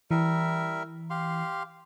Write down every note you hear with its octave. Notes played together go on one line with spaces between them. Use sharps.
E3 G3 A#4 E5
G4 F5 C6